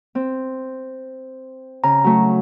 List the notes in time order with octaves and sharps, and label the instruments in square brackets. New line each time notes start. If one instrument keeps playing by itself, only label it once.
[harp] C4
[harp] C#3 [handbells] A#5
[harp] F#3 A3